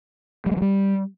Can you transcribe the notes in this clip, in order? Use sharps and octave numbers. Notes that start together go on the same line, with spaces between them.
G3
G#3
F3
G3